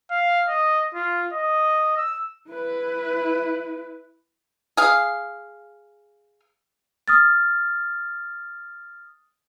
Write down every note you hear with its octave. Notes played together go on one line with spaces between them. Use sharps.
F5
D#5
F4
D#5
E6
E4 B4
G#4 F5
D#6 F6 A6